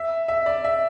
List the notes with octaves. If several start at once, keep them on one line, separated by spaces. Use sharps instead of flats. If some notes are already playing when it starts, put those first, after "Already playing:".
Already playing: E5
E5
D5
E5